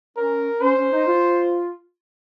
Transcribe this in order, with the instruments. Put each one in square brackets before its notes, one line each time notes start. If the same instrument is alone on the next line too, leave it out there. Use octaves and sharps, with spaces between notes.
[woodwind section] C#4 [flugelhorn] A#4
[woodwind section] C#4 [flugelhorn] C5
[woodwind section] C#4
D#4
F4